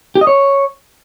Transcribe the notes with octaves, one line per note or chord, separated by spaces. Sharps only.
G4
D#5
C#5